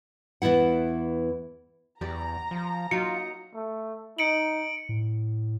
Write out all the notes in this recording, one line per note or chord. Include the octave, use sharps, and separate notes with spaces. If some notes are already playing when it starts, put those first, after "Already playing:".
E2 E3 B3 E4 F#5
E2 G4 D5 A#5
F3
F#3 A#3 D#4 F4 C#7
A3
D#4 C#7 D7 F#7
A2